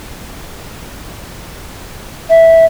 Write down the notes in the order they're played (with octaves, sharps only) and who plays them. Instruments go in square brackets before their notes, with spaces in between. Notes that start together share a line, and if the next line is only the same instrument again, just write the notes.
[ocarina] E5